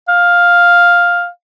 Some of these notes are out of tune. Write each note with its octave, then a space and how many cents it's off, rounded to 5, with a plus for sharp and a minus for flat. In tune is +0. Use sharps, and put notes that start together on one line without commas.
F5 +5